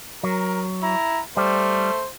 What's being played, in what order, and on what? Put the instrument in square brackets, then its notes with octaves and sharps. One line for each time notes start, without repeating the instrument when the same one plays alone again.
[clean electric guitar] F#3 [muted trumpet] A#4
[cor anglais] E4 [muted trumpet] A#5
[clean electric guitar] G3 [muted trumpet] A3 [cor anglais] C5